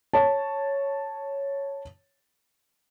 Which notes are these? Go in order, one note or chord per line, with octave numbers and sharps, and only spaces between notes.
C#5 A5